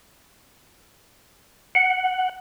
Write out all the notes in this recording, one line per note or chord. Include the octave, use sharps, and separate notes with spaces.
F#5